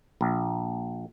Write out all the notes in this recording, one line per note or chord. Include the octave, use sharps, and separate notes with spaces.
A#1